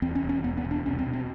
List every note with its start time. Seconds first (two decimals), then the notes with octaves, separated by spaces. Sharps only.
0.02 E2 C4
0.15 C#4
0.23 E1
0.29 C#4
0.44 E1 B3
0.57 B3
0.64 E1
0.71 D4
0.86 C2 C#4
0.99 C4
1.07 B2
1.13 C4